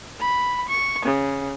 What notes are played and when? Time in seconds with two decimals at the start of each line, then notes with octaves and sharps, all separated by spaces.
0.20 B5
0.68 C#6
1.04 C#3